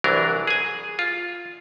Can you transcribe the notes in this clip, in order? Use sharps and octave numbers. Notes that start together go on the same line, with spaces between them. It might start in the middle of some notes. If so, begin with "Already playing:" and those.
C2 E3 F#3 D4 A#4
G#4 G#5
F4